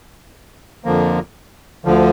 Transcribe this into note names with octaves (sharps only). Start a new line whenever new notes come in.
F2 D3 F3 A#3
D2 D3 F3